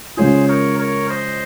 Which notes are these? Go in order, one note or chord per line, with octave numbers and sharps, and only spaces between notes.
C#3 F3 G#3 C#4 F4 G#4 C5
A#4 C#5
A#4 C#5
C5 D#5